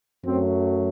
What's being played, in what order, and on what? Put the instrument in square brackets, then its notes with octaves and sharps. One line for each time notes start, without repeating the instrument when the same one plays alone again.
[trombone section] F#2 F#3 A3 C4